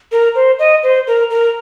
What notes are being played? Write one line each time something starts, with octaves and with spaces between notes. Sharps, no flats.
A#4
C5
D#5
C5
A#4
A#4